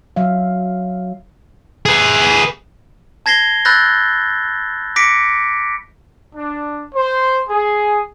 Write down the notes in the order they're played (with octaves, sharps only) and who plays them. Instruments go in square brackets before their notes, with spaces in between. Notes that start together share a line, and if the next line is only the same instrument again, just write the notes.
[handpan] F#3 E5 F5
[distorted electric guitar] G#4 B4
[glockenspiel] A5 G#6 A#6 C7 G7
B5 E6 F#6 G6 A6 A#6
D6 A#6 B6 C#7 D7
[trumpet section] D4
C5
G#4